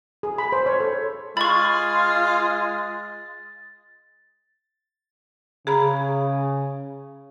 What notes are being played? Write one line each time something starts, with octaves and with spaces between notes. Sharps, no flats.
G#4
B5
C5
C#5
A4
G#3 F4 B5 C#6 A6
C#3 G#4 A#5 B5